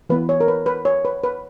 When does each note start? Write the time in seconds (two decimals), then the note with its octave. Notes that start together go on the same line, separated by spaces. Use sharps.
0.09 E3 B3 B4
0.29 C#5
0.40 A#4
0.48 B4
0.66 B4
0.85 C#5
1.05 B4
1.23 B4